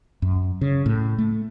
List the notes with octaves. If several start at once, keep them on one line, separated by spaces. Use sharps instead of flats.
F#2
C#3
A2
A3